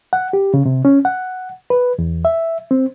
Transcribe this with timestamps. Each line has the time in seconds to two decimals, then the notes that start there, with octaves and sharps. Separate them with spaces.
0.13 F#5
0.33 G4
0.54 C#3
0.66 C3
0.85 C#4
1.05 F#5
1.70 B4
1.99 E2
2.25 E5
2.71 C4